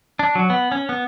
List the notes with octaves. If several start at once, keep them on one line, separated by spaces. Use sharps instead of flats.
D4
F#3
B3
C#4
B3